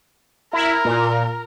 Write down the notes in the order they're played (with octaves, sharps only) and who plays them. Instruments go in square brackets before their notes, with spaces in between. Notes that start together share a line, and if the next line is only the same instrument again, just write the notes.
[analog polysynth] E4 [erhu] A#4
[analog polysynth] A#2